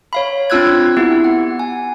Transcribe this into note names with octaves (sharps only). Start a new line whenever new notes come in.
C#5 F5 B5
C4 D4 F4 E6 F#6 G#6
B3 E4 G4
F#5
G#5